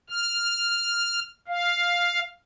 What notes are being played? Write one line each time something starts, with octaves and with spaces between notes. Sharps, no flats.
F6
F5